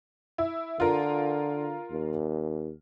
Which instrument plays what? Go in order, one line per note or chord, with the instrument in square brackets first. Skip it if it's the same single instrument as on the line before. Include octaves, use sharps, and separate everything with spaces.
[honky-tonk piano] E4
[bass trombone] D3 [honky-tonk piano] F4 A#4
[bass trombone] D#2